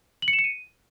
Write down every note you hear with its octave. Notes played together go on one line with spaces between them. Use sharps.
F#7
C#7
E7
C#7
D#7